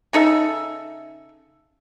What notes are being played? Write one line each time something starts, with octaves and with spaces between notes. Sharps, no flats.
C#3 D#4 A4 E5